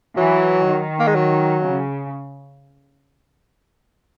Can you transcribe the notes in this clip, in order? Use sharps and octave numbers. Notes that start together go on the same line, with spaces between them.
E3 F#3
D#3
A#3
G#3
F#3
C#3